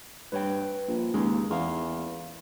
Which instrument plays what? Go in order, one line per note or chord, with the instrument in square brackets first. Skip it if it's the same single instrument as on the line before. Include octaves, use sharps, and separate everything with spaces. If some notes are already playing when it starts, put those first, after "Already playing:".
[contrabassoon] G2 [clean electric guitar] B4 C#5 G5
[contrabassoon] A#1
[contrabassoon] D#2 [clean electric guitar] G#3 C#4 G#4
[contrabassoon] E2 [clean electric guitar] A#4 F5